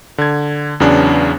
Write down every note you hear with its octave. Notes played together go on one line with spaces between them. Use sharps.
D3 G#6
E2 C#3 F#3 B3 C#4 D4